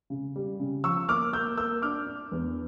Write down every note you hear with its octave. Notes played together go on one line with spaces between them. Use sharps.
C#3
G3
C#3
F3 C#6 E6
A#3 D6 F6
A#3 E6 G6
A#3 E6 G6
D4 D6 F6
D4
E2